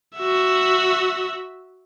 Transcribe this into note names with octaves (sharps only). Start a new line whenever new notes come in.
F#4 E5